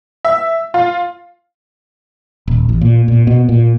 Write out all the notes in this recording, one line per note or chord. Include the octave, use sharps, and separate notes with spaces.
E5
F4
D#1
A1
A#2
A#2
B2
A#2